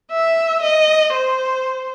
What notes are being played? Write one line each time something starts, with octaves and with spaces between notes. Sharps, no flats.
E5
D#5
C5